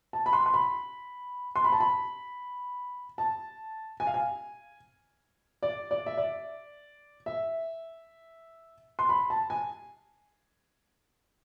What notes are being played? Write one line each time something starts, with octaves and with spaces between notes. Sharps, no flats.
A5
B5
C6
C6
B5
C6
B5
A5
B5
A5
G#5
F5
G#5
D5
D5
E5
D5
E5
C6
B5
A5
G#5